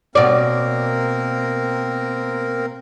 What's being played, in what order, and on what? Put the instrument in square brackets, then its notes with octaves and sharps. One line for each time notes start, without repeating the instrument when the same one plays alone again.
[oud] B2 D5 [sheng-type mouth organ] A#3 C4 A#4